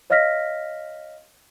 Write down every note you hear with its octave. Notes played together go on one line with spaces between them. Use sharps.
C#5 D#5 F5 F6 A#6 B6